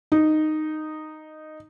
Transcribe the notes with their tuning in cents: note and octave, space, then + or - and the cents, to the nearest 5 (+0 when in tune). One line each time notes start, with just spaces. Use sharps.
D#4 -10